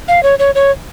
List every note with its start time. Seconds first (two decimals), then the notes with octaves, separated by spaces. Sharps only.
0.08 F5
0.23 C#5
0.39 C#5
0.55 C#5